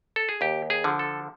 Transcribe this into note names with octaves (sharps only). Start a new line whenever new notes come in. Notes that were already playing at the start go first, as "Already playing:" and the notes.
A4
G#4
D#2 G4
G#4
D3 F3
A4